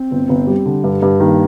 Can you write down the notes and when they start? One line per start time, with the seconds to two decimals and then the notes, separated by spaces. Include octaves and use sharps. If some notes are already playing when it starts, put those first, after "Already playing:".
Already playing: C4
0.11 G1
0.29 G1
0.47 G3
0.66 D3
0.84 G2
1.02 G2
1.20 D#3 A#3